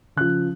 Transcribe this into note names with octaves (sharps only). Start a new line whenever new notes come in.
C#3 F3 F#6